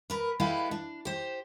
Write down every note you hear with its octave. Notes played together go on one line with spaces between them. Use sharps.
A#4 B4
G#3 E4 G4 A4 B4 F5
D4
G4 C5